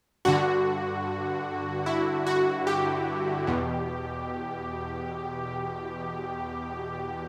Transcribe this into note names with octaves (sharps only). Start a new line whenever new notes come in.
G2 D3 F#4
E4
F#4
G4
E2 B2